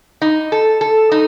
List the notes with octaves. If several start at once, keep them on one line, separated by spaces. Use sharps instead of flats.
D#4
A4
A4
D#4